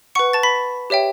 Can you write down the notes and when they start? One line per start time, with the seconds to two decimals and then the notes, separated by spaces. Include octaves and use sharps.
0.15 B4 F#5 C#6 C#7
0.33 A5 A6
0.43 B5 B6
0.90 G4 C#5 E5 G5